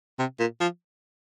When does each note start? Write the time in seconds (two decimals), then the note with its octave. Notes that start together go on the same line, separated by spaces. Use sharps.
0.19 C3
0.40 A#2
0.61 F3